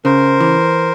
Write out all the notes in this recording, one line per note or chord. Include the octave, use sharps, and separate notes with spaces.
C#3 A#4 C5
E3